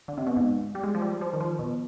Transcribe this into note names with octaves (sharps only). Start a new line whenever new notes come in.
D3
C3
B2
G#2
G3
G#3
F3
G3
F3
D#3
F3
B2